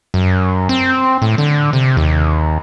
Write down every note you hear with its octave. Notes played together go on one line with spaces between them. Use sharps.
F#2
C4
A2
D3
C3
D#2